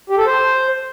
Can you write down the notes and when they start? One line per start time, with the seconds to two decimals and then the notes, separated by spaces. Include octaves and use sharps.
0.10 G4
0.18 A4
0.26 C5